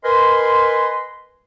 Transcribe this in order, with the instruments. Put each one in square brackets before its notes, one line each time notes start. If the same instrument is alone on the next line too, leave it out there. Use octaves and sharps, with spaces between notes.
[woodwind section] A#4 B4 D#5 G#5 B5 C6